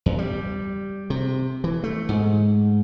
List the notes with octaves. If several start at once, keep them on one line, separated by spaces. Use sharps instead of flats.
E2
G3
C3
E3
A3
G#2